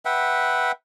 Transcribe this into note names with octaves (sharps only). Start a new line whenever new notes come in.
B4 E5 F#5 G5